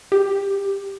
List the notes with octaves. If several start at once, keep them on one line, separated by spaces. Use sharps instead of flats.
G4